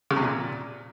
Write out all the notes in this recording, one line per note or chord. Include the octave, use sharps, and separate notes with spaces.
C#3
C3
A#2